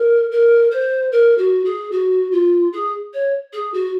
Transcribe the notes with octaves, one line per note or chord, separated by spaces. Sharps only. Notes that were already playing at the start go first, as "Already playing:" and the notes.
Already playing: A#4
A#4
C5
A#4
F#4
G#4
F#4
F4
G#4
C#5
G#4
F#4